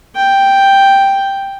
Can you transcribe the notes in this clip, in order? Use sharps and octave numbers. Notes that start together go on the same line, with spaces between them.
G5